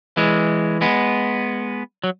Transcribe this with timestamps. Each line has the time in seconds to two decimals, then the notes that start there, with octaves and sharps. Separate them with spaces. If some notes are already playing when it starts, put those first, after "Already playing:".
0.17 E3 G#3
0.81 G#3 B3
2.04 F#3